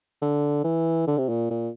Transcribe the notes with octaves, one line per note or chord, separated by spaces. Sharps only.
D3
E3
D3
C3
A#2
A#2